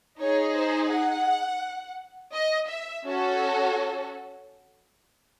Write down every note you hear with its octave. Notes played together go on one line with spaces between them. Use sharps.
D#4 G#4 C#5
C5
F#5
D#5
E5
C#4 F#4 A4